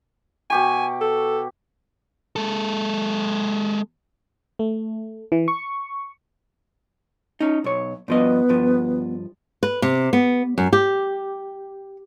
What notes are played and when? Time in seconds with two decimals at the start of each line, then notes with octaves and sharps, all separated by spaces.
0.50 B2 G4 G#5 C#6
1.01 A4
2.36 G#3 A4
4.59 A3
5.32 E3
5.48 C#6
7.40 C#4 D#4
7.64 B1 C#5
8.08 G2 F3 B3 D#5
8.49 G2 F3
9.63 B4
9.82 C3
10.13 B3
10.58 F#2
10.73 G4